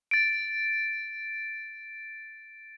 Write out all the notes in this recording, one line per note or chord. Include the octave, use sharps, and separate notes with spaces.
A6 D7